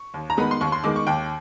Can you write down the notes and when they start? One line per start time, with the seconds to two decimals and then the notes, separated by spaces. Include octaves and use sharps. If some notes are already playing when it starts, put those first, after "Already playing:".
Already playing: C#6
0.14 D#2
0.30 A#5
0.37 D#3 G#3 B3 B5
0.51 C6
0.61 D#2 C#6
0.72 C6
0.84 D#3 G#3 B3 D6
0.96 C#6
1.07 D#2 G5